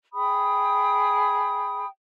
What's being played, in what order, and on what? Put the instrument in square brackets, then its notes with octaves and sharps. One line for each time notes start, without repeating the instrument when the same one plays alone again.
[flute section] G#4 G5 B5 D#6